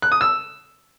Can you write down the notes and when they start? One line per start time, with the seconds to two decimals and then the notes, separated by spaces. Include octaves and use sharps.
0.02 F#6
0.12 D#6
0.21 E6